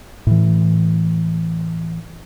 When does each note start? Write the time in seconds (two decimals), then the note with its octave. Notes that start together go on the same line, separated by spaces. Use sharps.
0.27 A2 E3